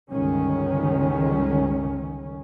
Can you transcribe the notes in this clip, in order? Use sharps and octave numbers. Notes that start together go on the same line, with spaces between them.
G1 C#2 D#3 C#4